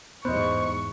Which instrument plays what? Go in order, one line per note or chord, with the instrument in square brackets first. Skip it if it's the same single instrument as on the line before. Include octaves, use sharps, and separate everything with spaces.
[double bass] E2 G#2 [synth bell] B3 [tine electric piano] C5 D#5 [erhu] C#6